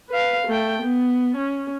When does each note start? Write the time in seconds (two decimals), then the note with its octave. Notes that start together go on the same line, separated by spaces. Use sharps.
0.10 B4 F5
0.48 A3 G5
0.83 B3
1.37 C#4